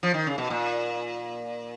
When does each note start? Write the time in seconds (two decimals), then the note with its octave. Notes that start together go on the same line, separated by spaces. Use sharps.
0.03 F3
0.14 D#3
0.27 C#3
0.38 B2
0.50 A#2